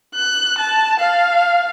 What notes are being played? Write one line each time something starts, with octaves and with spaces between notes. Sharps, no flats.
F#6
A5
F5